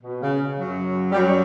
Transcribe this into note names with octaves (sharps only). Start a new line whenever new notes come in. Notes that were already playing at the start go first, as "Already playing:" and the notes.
B2
C#3
F#2 F#3
G3
F#2 F#3